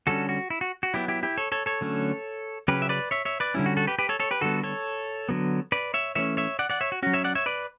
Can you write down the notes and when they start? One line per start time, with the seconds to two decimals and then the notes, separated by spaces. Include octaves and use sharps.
0.07 D3 G3 C#4 F#4 A4
0.29 F#4
0.50 E4
0.61 F#4
0.83 F#4
0.94 F#3 B3 E4 G4
1.08 E4 G4
1.23 E4 G4
1.37 A4 C#5
1.52 A4 C#5
1.66 A4 C#5
1.81 D3 F#3 A3 C#4
2.68 C#3 F#3 C#4 G4 B4
2.82 E5
2.89 B4 D5
3.11 C#5 E5
3.25 C#5 E5
3.40 B4 D5
3.54 D3 G3 C#4 E4
3.66 F#4
3.77 F#4 A4
3.87 G4 B4
3.99 G4 B4
4.09 A4 C#5
4.20 A4 C#5
4.31 G4 B4
4.41 D3 G3 B3 F#4 A4
4.63 A4 C#5
5.29 D3 F#3 B3
5.72 B4 D5
5.94 C#5 E5
6.15 E3 A3 C#4 C#5 E5
6.37 C#5 E5
6.59 D5 F#5
6.70 D5 F#5
6.81 C#5 E5
6.92 F#4
7.03 F#3 C#4 F#4
7.13 C#5 E5
7.24 D5 F#5
7.35 C#5 E5
7.46 B4 D5